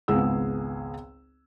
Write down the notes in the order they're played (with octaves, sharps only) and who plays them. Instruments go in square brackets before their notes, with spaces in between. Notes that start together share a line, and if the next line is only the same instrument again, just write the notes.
[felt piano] G#1 C#2 B3 G#4 E6